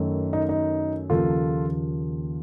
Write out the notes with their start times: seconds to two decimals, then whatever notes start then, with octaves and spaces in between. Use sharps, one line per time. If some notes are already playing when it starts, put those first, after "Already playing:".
Already playing: F#2 D#3 F#3 A3
0.33 D#4
0.49 D#4
1.10 D#2 C#3 F3 A#3 F4 A4